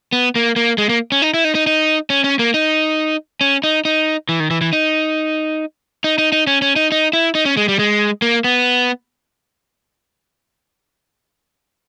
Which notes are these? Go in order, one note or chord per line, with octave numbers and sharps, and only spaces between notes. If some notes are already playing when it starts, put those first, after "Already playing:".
B3
A#3
A#3
G#3
A#3
C#4
D#4
E4
D#4
D#4
D#4
C#4
C#4
A#3
D#4
C#4
D#4
D#4
E3
D#3
E3
E3
D#4
D#4
D#4
D#4
C#4
C#4
D#4
D#4
E4
D#4
C#4
G#3
G3
G#3
A#3
B3